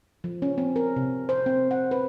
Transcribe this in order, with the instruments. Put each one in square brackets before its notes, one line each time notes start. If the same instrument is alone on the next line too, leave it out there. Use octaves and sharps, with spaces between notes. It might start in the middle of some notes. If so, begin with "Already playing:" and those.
[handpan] F3
C#4
C4
A#4
C3
C5
C4
F#5
B4